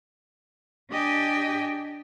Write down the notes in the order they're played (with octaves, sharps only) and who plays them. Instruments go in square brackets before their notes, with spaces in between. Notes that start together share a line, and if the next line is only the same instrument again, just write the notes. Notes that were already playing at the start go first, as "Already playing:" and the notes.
[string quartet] D4 G4 D#5 G5 G#5